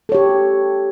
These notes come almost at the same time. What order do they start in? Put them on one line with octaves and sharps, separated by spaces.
A4 C#5 G4